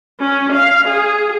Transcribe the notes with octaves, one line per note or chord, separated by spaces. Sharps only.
C#4
F5
G#4